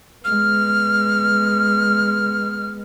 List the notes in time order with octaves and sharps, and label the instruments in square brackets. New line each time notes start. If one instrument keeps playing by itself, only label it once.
[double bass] G#3 B3 [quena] F6